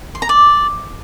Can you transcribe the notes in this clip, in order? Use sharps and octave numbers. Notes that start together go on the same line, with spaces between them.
C6
A#5
D5